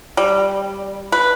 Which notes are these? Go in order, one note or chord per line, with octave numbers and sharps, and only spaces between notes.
G3
B4